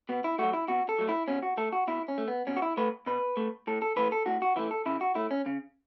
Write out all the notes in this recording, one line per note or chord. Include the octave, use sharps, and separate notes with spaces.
B2 B3
E4
F#3 A3 F#4
E4
B2 F#4
A4
F#3 A3
E4
B2 C#4
F#4
A3 A4
F#4
B2 E4
C#4
A3
B3
B2 C#4
F#4
E4
A3 B4
B2 B4
A3
A2 A4
A4
E3 A3 B4
A4
A2 F#4
F#4
E3 A3 E4
A4
C#3 E4
F#4
A3 E4
C#4
C#3